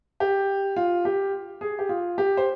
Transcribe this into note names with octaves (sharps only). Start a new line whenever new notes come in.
G4
F4
G4
G#4
G4
F4
G4
C5